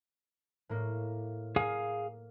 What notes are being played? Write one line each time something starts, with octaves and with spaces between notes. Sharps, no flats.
A2 A#3
A#3 G#4 F5 G#5